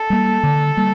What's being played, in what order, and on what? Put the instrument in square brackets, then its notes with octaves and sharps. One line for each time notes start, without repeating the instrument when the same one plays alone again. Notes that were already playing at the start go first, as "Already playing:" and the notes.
Already playing: [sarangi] A4
[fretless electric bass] G3 A#3
D3
G3 A#3